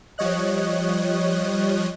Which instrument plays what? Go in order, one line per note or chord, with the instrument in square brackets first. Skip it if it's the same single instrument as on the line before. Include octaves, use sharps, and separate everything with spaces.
[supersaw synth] F3 G3 C#5 D#5 F#6